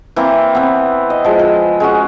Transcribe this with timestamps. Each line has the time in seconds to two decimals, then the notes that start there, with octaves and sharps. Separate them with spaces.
0.16 E3 A#3 C4
0.55 B3 C4
1.10 D#5
1.24 F3 G#3
1.39 F3
1.80 G#3 C#4 F#4